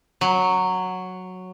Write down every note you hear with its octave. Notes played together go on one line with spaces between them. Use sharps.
F#3